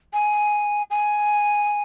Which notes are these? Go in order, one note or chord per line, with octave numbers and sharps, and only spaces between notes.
G#5
G#5